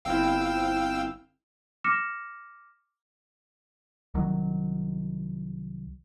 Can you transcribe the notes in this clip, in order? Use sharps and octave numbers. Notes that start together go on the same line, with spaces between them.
G1 C4 E4 F5 G5 E6
D6 F6 A#6 C#7 E7
C2 D#3 F#3